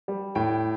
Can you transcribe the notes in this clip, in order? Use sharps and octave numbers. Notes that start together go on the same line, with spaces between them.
G3
A2 G5